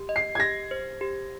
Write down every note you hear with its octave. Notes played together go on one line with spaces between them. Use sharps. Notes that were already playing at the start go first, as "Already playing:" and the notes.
Already playing: G4
D#5
C7
G#6
G4 A#6
C5
G4